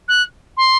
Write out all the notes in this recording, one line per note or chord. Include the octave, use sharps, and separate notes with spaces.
F#6
C6